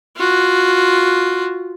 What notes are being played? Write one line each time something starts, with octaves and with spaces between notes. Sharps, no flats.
F4 F#4